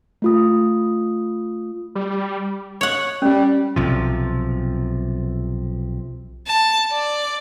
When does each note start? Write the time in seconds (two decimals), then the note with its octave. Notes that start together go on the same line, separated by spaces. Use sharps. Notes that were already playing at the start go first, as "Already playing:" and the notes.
0.22 A3 F4 D#6
1.95 G3
2.81 C#5 F#5
3.22 G3 C#4
3.76 B1 C3 F3
6.46 A5
6.92 D5